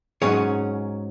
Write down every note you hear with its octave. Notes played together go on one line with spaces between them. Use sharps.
G#2 F#3 C#4 G#4 C#5